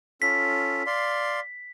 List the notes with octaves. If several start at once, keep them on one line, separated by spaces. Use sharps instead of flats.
C#4 F4 A4 B6
D5 F5 C6